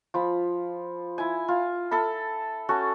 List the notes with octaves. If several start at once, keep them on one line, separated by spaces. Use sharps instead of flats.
F3 B5
E4 G#5
F4
A4 E5 B5
C#4 F#4 A4